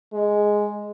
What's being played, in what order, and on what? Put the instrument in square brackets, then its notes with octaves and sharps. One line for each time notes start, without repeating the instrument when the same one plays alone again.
[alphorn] G#3